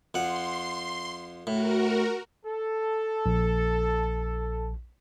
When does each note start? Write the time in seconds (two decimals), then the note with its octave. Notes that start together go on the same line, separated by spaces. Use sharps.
0.14 F2 F#5 C6
1.47 A2 F#4 A#4
2.45 A4
3.26 A#1